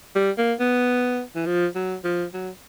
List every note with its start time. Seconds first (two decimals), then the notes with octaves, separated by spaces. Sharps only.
0.15 G3
0.38 A#3
0.60 B3
1.36 E3
1.46 F3
1.75 F#3
2.04 F3
2.34 F#3